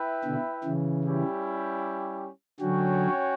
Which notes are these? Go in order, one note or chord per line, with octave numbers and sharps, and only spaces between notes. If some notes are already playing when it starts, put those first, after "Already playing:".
Already playing: E4 B4 E5 G5
B2 D3
C#3 E3
G3 C#4 E4 G4
D3 F#3 C#4 F#4 C#5 G5